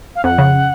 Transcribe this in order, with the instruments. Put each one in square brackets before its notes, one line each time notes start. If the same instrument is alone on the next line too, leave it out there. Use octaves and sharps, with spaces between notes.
[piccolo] F5
[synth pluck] F2 [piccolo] F#5
[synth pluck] C#3